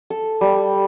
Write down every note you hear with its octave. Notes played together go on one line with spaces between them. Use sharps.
A4
G3